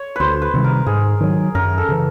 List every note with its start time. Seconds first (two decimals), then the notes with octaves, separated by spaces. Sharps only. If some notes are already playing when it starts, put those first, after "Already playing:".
Already playing: C#5
0.16 D2 B4 C5
0.42 B4
0.54 C3 D#3 G3
0.64 A#4
0.86 G#2 G#4
1.20 D#3 F#3
1.55 F#2 A#4
1.78 A4
1.89 C#3 E3